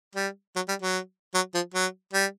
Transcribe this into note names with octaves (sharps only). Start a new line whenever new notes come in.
G3
F#3
G3
F#3
F#3
F3
F#3
G3